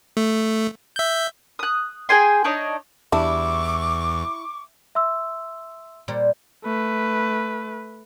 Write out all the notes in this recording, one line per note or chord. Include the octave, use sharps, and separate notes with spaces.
A3
E5 G6
D#6 F#6
G#4 G5 G#5 C6
D4 D#4 C#5 D#5
E2 G3 D4 E4 C#6 D6
E5 C6 E6
A#2 G3 C5
A3 B4